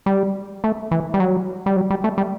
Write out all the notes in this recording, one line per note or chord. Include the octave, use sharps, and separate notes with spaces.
G3
A3
E3
G3
F#3
G3
F#3
G3
A3
G3